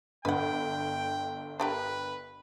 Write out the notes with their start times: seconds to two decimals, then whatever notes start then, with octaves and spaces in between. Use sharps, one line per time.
0.25 G1 B4 F#5 G5
1.60 D4 G4 A#4 B4